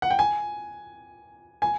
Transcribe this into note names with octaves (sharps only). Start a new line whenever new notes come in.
F#5
G5
G#5
G#5